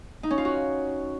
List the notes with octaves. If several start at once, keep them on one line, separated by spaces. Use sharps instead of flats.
D#4
C#4
F4
F#4